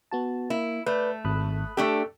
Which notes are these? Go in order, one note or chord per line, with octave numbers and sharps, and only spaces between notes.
B3 F#4 A5
A#3 E4
A3 B4 D5 G6
G#1 B5 D#6 F#6
A3 D4 G4 A4